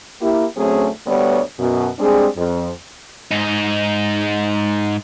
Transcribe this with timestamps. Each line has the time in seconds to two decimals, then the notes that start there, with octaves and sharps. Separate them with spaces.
0.21 A#3 E4 G4
0.57 D2 F#3 A3 C4 C#4 G#4
1.06 D2 G3 B3 B4 C#5 D5
1.59 F#2 B2
1.99 G3 G#3 C4 D4 G#4
2.37 F2
3.31 G#2 D#4